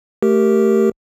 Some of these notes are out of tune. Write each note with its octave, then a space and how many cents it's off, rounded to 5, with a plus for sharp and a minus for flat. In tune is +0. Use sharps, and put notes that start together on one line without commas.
A3 +5 G4 -5 A#4 +0